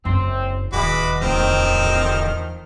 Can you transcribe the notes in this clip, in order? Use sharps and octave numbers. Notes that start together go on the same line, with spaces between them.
F#1 F#2 C4
D1 D#2 E3 G#3 F#4 B5 D6
D1 E2 D#3 F3 C4 C5 F6